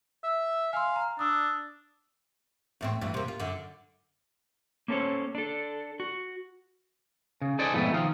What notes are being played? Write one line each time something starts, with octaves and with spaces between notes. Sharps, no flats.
E5
F5 G#5 C6
A#5
D4 D#6 E6
E2 A2 C4
E2 G2 E3
C3 A#3
F4
F#2 D3
A#3 C#4 A4 C5 C#5
D4 A4
F#4
C#3
D#4 G#4 A4 C5 D5 D#5
F2 G#2 B2 A3 B3
D#3 F3 D#4 F5